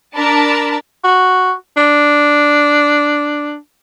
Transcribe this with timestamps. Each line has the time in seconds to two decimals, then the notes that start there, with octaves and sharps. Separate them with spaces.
0.15 D4 A#4 A5 B5
1.04 F#4
1.77 D4